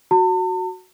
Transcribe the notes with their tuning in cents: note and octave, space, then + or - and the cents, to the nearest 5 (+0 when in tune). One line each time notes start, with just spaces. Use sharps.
F#4 +0 A5 +45